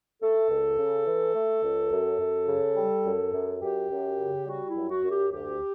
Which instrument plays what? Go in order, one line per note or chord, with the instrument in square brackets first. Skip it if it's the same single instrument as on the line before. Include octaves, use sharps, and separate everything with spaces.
[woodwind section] A3 A4
C#2
C#3
E3
A3
C#2
F#2
F#2
C#3
G3
F#2
F#2
F#2 G4
F#2
C#3
G3 F#4
E4
F#2
F#4
F#2
G4
D2 G4